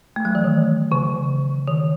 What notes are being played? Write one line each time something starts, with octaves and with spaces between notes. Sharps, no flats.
A3
F#3
E3
D#3
C#3
D#3